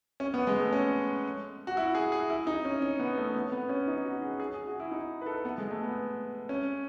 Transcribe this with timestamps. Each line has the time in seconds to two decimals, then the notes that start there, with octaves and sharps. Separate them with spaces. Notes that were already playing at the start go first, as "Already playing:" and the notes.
0.20 C#4
0.34 B3
0.47 G#3
0.60 A3
0.73 C#4
1.67 F#4
1.77 E4
1.95 G#4
2.12 G#4
2.30 E4
2.47 D#4
2.65 C#4
2.82 C#4
3.00 B3
3.18 A3
3.34 B3
3.52 B3
3.69 C#4
3.87 D#4
4.05 F#4
4.22 G#4
4.40 G#4
4.54 G#4
4.67 F#4
4.80 E4
4.92 D#4
5.21 B4
5.26 A4
5.45 B3
5.58 G#3
5.71 A3
5.84 B3
6.49 C#4